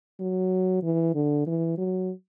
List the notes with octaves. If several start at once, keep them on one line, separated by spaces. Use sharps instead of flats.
F#3
E3
D3
E3
F#3